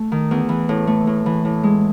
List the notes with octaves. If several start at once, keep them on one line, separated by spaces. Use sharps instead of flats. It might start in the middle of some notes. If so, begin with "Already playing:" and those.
Already playing: A3
D#3
E2
E3
A2
A3
A2
E3
A2
G#3